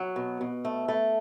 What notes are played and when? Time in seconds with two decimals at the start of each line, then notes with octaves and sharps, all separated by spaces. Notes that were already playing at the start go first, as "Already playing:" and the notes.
Already playing: F#3
0.16 B2
0.41 B2
0.65 A3
0.88 A3